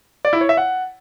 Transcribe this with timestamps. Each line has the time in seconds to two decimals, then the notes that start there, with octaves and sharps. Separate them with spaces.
0.25 D5
0.33 E4
0.41 C#5
0.49 E5
0.57 F#5